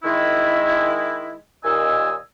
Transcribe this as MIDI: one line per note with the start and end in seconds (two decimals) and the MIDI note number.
0.03 1.36 51
0.03 1.36 56
0.03 1.36 64
1.63 2.15 39
1.63 2.15 46
1.63 2.15 51
1.63 2.15 75
1.63 2.15 80
1.63 2.15 88